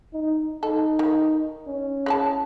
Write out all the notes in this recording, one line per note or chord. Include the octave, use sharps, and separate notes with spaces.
D#4
D#4 A4
D#3
C#4
G#3 E4 A5